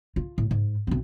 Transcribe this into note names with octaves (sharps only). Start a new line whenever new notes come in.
F4
A2
G#2
B1 C4